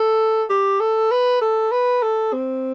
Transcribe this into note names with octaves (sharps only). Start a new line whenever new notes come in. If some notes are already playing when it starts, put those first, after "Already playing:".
Already playing: A4
G4
A4
B4
A4
B4
A4
C4